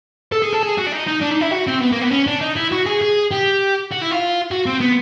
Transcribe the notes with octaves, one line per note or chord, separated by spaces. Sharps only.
A4
G#4
A4
G#4
F#4
D4
D#4
D#4
D4
D#4
E4
F#4
C4
B3
A#3
B3
C#4
D4
D#4
E4
F#4
G#4
G#4
G4
F#4
E4
F4
F#4
C4
B3